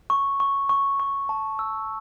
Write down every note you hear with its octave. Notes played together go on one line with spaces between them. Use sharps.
C#6
C#6
C#6
C#6
A5
E6